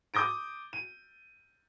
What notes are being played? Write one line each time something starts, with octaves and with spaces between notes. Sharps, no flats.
D6 D#6 G6 A#6 D7
D#7